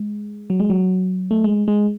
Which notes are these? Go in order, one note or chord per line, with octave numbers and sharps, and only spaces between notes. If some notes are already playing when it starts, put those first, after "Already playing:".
Already playing: G#3
F#3
G#3
F#3
A3
G#3
G#3